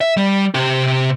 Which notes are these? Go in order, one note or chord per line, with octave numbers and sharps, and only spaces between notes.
E5
G3
C3 G4